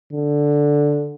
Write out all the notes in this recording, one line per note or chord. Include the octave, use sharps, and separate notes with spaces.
D3